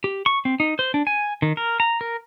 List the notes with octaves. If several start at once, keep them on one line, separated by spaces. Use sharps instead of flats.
G4
C#6
C4
D#4
C5
D4
G#5
D#3
A#4
A#5
A#4